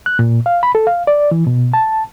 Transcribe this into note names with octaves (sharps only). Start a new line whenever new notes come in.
F#6
A#2
F5
B5
A4
F5
D5
E3
B2
A5